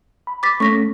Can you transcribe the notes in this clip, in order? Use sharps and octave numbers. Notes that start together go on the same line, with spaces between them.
B5
D6 A6 B6
A3 A#3 C#4 C#6 A#6 B6